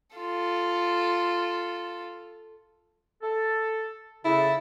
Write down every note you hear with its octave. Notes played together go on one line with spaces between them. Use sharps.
F4 A4
A4
C#3 E4 A4